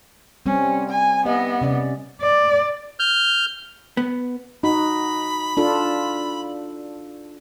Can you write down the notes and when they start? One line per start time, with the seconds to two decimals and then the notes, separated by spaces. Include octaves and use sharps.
0.46 G3 C4 C#4
0.89 G#5
1.26 B3 G4 D#5 E5
1.61 C3 C#4 D5
2.21 D5
2.99 F6 G6
3.97 B3
4.63 D#4 F#4 B5
5.57 D4 F4 A4